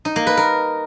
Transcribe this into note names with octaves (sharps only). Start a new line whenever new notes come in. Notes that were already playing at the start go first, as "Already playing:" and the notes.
D#4
A#3
B4
A#4